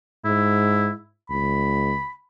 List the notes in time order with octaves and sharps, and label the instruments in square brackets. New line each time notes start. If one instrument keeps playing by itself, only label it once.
[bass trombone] G#2 [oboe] E4
[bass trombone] C#2 [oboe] B5